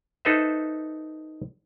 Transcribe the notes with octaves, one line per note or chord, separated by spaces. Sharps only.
D#4 A4 B4 C5 E5